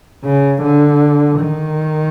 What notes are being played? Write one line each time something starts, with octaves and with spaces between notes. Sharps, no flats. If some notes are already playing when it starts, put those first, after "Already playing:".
C#3
D3
D#3